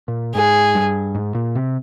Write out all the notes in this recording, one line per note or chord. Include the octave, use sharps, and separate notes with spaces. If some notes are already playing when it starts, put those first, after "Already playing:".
A#2
G#2 G#4
G2
G#2
A#2
C3